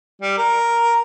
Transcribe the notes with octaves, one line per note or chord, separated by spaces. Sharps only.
G3
A#4